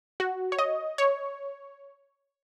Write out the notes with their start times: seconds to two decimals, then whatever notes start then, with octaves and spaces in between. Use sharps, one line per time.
0.20 F#4
0.52 C#5
0.59 D#5
0.98 C#5